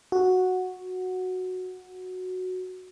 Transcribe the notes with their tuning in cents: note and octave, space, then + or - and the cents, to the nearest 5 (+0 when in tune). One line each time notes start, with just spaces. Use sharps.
F#4 -5